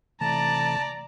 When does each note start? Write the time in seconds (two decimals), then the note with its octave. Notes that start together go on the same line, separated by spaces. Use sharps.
0.21 C3 E3 A3 D5 A5 A#5